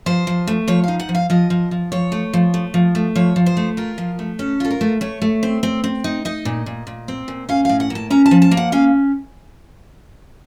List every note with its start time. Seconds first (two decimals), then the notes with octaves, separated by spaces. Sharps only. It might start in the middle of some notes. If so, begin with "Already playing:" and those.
0.06 F3 C5
0.27 F3
0.47 A3
0.68 F3 C#5
0.84 D#4 F5
1.00 F#5
1.09 F3
1.15 F5
1.30 F3 D#5
1.50 F3
1.71 F3
1.92 F3 C#5
2.12 A3
2.33 F3
2.54 A3
2.74 F3
2.95 A3
3.16 F3 C#5
3.36 F3
3.46 C5
3.57 A3
3.77 F4 A#4
3.98 F3
4.19 A3
4.39 C#4 A4
4.60 F4 A4
4.70 A#4
4.81 A3
5.01 A3 C#5
5.22 A3
5.43 C4
5.63 C4
5.84 C4
6.04 D#4
6.25 D#4 D#5
6.45 A#2
6.66 A#2
6.87 A#2
7.08 C4
7.28 A#2
7.49 C#4 F5
7.65 A2 F5
7.80 F#5
7.90 A#3
7.95 A5
8.10 C#4 A#5
8.26 A5
8.31 F3
8.42 A5
8.51 A#3
8.57 F#5
8.72 C#4 F5